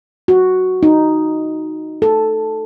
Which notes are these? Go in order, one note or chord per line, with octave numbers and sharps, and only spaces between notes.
F#4
D#4
A4